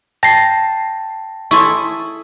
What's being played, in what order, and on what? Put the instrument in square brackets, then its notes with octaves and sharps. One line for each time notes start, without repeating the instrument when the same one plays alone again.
[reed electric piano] G5 A5 [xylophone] A#6 C7
[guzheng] E4 G#4 A4 [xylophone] C6 C#6